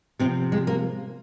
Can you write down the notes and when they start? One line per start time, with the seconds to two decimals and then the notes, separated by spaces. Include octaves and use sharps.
0.19 C3 F3 C4
0.52 G#3
0.67 A#3